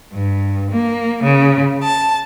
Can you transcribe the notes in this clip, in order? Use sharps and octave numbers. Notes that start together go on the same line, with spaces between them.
G2
A#3
C#3
A5